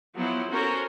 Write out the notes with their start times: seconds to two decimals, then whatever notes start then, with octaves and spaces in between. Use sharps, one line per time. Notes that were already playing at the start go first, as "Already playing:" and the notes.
0.16 F3 F#3 B3 E4 C5
0.51 C#4 F#4 A4 A#4 C5 C#5